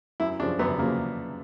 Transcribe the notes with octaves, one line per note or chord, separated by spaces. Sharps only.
F#2 E4
C#3 F3 D4
F#2 B3
C#3 F3 A#3